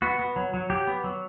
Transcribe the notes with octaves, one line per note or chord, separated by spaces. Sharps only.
B3 F#4
B3
F#3
F#3
F#3 G4
B3
F#3